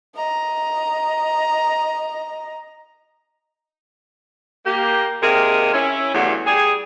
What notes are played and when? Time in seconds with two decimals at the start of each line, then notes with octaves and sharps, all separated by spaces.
0.15 D#5 A#5
4.65 A#3 G4
5.22 C3 D#3 A#3 G#4 A#4
5.74 C#4 E4
6.14 E2 G2 F#3 A3
6.46 G3 G#4